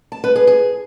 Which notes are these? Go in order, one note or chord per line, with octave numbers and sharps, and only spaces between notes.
A5
B4
G#4
G#4